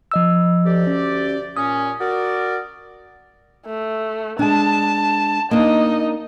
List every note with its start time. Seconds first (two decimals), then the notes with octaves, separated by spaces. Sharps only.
0.12 F3 D#5 E6
0.66 D2 G4 D5
0.87 C#4
1.57 A#2 C#4 D#6
2.01 F#4 A#4 D5
3.66 A3
4.39 G#3 D4 A5
5.51 A#3 D4 D#4 D#5